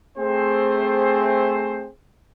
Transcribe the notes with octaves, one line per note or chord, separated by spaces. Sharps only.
A3 C4 G#4 C5